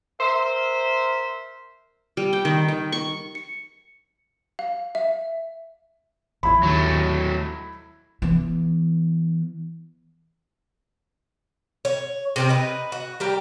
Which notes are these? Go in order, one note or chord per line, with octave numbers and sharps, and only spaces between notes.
A#4 C5 E5
G3
G5
D#3
D#3
C#6
C#7
F5
E5
A1 F2 E4 B5
D#2 F#3 A3
E3 B3
C#5
C3 C4 A#4
D#4 B4
F#4
G3 G4 A#4